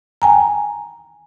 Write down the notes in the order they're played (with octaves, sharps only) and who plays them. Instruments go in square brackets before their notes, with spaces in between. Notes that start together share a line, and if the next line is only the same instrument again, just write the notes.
[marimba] G5 G#5 A#5